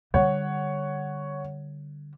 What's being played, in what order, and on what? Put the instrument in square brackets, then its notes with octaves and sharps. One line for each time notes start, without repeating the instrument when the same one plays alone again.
[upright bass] D3 G3 [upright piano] C#5 F#5